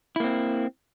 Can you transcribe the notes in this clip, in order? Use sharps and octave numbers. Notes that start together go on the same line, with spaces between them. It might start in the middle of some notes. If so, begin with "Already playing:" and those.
A#3 C4 E4